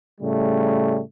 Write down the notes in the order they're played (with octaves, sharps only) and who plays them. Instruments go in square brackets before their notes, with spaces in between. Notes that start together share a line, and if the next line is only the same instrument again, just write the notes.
[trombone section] A2 C#3 G3 A3